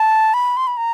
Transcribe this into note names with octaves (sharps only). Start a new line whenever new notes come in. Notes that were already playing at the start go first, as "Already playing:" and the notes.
Already playing: A5
B5
C6
B5
A#5